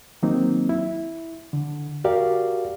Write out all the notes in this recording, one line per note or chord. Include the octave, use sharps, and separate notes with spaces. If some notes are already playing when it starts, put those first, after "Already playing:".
D#3 F#3 A#3 C4 D#4
E4
D3
F#4 G4 A#4 D5 F5